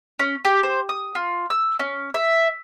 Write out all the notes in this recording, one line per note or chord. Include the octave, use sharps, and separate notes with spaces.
C#4
G4
C5
D#6
F4
E6
C#4
E5